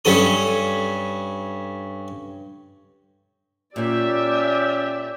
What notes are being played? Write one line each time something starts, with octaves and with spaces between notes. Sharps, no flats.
G2 C#4 A4 D#6
A#2 A#3 C#4 G4 D5 E5